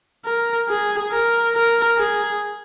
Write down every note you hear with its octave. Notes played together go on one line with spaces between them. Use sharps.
A#4
G#4
A#4
A#4
G#4